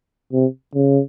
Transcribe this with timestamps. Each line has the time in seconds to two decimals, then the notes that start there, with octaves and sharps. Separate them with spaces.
0.33 C3
0.75 C#3